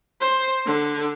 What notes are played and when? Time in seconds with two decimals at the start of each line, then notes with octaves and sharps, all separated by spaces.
0.20 C5
0.65 D3